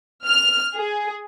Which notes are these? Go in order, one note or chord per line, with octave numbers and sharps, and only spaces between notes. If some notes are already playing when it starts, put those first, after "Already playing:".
F6
G#4